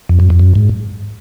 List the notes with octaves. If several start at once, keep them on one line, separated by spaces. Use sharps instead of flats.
F2
F#2
F2
F#2
G#2